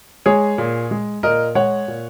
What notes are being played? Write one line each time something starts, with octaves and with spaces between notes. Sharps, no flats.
G#3 G#4 C#5
A#2
G#3
A#2 A#4 D#5
G#3 C#5 F#5
A#2